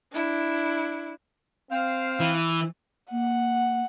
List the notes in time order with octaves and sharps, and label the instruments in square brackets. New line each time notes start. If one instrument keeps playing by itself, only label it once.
[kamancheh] D4 E4
[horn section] C4 F5
[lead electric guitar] E3
[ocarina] A#3 [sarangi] F#5